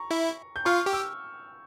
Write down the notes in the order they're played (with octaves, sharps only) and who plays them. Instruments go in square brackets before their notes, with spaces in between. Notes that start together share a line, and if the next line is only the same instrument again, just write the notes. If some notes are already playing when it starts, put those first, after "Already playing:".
Already playing: [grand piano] A#5 C#6
[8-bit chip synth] E4 E5
[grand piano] G6
[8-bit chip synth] F4 F5 [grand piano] C#6 F6
[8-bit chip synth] G4 G5
[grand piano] E6